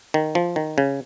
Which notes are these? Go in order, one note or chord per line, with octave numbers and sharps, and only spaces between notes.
D#3
F3
D#3
C#3